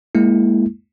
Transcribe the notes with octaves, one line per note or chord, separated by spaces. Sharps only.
G#3 A#3 E4